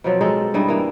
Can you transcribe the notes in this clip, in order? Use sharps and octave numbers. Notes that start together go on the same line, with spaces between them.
B2 F3 F#3 C4
G#3 D#4 A4 E5
G2 G3 E4 D#5
E3 A#3